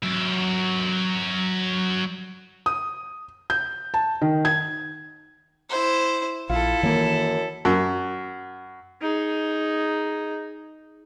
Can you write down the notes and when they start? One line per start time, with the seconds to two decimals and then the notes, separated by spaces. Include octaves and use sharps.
0.03 F#3 E5
2.66 D#6
3.50 G6
3.94 A5
4.21 D#3
4.45 G#6
5.70 E4 C5
6.49 A#1 E4 F4 A4
6.83 F#2 D#3 E3 A#3
7.65 F#2
9.02 D#4 G#4